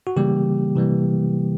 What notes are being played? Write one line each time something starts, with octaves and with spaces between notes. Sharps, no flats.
F#4
C#3 E3 G3 A#3 G4
C3 E3 G3 A#3